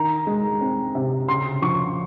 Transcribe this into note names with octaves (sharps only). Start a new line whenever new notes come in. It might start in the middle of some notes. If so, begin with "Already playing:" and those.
Already playing: D#3 A#5
G#3
C4
C3
C#3 C6
F3 C#6